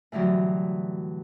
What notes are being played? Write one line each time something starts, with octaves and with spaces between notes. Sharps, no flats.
A2 D3 E3 F#3 G3